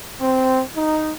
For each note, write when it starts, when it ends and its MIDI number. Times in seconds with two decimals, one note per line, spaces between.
0.21 0.62 60
0.76 1.13 63